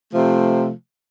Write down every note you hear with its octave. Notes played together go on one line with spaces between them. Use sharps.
C3 F3 A3